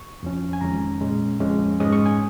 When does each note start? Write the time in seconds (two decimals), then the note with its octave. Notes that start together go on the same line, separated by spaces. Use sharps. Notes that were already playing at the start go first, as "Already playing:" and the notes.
Already playing: C#6
0.23 F2 F3 C#4
0.53 G#5
0.61 F2 D#3 G#3 C#4 A#5
1.01 A#2 G#3 C#4
1.40 F2 F3 G#3 C#4
1.80 G#2 G#3 C#4 D#6
1.92 C#6
2.06 G#5